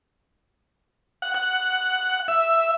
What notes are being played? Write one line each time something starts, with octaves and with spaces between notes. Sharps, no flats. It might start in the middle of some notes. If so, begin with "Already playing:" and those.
F#5
F#5
E5